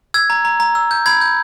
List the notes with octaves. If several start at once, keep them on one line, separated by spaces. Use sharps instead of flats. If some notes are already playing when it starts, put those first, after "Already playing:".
E6 G#6
A#5
A#5
A#5
E6
G6
B5 G#6
G6